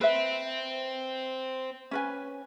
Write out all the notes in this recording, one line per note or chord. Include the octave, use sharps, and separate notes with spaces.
C4 B4 E5
C#4 B4 G#5